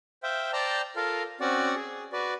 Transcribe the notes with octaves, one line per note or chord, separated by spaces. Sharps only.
C5 E5 F5 G5
C5 D5 G5 A5 A#5
F4 A4 A#4 F5
C4 C#4 F#4 D5 F#5
G#4
F#4 B4 D5